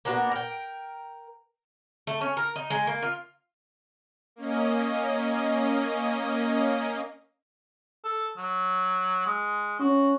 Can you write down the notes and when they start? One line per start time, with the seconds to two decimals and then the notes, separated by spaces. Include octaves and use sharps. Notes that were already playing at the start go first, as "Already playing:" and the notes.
0.05 A#3 B3 D4 F#4
0.32 A#4 G5
2.07 A3
2.21 C#4
2.37 A#4
2.56 D#4
2.70 G#3
2.87 A#3
3.02 F4
4.36 A#3 C#4 D#5
8.04 A4
8.37 F#3
9.26 G#3
9.80 C#4 F#4